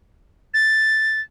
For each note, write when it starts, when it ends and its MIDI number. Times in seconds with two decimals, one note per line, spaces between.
0.54 1.20 93